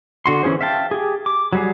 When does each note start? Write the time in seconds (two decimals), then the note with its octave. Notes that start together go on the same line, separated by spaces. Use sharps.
0.26 D3 F#4 C6
0.43 E3 C#4 F4 G#4 C5
0.61 E5 F5 G5 A5
0.91 G4 G#4
1.26 D6
1.53 F#3 G3 G#4